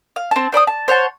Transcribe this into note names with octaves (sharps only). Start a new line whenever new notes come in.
F5
C4 A5
C5 D5 B5 D#6
A5
C5 C#5 F#5 A5